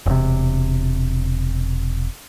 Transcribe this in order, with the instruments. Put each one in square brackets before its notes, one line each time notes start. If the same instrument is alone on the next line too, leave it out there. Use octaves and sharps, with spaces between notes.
[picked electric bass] E1 C3